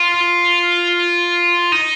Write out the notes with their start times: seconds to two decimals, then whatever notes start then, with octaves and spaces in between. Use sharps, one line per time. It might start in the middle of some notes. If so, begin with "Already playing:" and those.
Already playing: F4
1.72 D#4